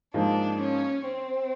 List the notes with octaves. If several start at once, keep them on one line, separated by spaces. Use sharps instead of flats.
G#2 F3 A#3 D4 D#4
C#4
C4